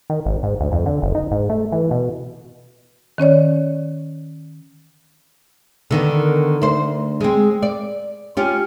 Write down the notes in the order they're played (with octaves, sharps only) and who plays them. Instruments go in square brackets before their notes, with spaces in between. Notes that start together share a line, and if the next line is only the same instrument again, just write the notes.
[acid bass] D#3
G#1
G#2
D2
F2
D3
F#1
D#4
G#2
A3
E3
B2
[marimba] D#3 C#4 C#5 D5
[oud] D3 D#3 B3
D2 C5
G#3 C4
D5
C#4 F4 G4